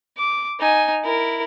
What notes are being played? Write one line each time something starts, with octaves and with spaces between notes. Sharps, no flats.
D6
D#4 G#5
E4 A#4